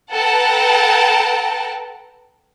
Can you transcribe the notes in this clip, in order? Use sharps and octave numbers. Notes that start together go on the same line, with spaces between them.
A4 B4 F#5 G5 A5 A#5